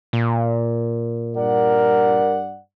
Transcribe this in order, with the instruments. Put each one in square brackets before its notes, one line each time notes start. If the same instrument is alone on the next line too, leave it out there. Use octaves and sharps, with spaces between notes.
[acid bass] A#2
[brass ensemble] G2 D5 F#5 [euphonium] A#4